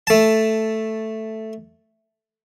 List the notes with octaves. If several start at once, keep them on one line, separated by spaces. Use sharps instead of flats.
A3 A5